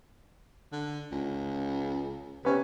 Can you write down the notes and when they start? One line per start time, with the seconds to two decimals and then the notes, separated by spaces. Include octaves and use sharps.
0.72 D3
1.11 C#2
2.45 C3 B3 C#4